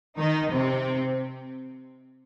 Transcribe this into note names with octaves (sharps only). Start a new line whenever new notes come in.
D#3 D#4
C3 C4